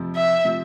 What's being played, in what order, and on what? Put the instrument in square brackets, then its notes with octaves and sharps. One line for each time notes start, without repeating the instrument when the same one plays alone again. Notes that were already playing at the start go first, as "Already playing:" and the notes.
Already playing: [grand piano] F2 C3 F3
[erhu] E5
[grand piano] C3 F3